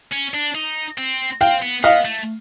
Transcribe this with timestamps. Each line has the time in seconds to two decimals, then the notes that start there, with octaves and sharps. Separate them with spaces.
0.12 C#4
0.34 D4
0.55 D#4
0.98 C4
1.41 C4 F5 G5
1.62 B3
1.83 B3 D#5 F5
2.05 A3